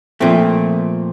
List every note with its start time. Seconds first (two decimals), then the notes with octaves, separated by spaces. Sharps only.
0.20 A#2 F3 A3 C4